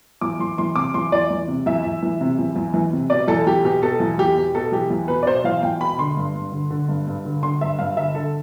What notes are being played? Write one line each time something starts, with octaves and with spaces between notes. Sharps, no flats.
E2 D6
E2 C6
E3 C6
C3 D6
E2 C6
E2 D5
E3
C3
E2 E5
E2
E3
C3
E2
E2
E3
C3
B2 D5
E2 A4
E2 G4
B2 G4
B2 A4
E2
E2 G4
B2
B2 A4
E2 G4
E2
B2 B4
D5
B2 C5
E2 F5
E2 G5
B2 B5
D3 C6
G2
G2
D3
D3
G2
G2
D3
D3 C6
G2 E5
G2 F5
D3 E5
D3 A4